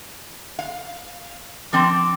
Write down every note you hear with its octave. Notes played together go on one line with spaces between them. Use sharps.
F5
F3 C4 D6